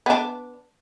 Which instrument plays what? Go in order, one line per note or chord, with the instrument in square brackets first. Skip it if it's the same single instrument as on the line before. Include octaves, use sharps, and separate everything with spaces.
[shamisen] B3 D4